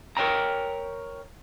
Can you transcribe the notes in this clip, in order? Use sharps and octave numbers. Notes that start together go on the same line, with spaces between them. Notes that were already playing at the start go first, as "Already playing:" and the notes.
A#4 B4 C#5 G5 A#5